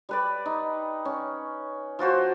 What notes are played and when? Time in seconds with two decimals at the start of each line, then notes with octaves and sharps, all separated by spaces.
0.09 G3 B4 D5
0.46 D#4
1.05 C#4
1.99 F3 F4 F#4 C5